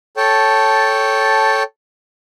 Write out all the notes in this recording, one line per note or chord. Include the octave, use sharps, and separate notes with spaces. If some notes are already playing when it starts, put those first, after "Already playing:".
A4 C#5 G5 A5